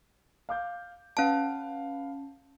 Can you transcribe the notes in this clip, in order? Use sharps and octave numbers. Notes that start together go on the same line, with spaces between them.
F5 D6 G6
C#4 B4 F5 A5